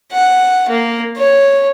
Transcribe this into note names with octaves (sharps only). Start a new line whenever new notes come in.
F#5
A#3
C#5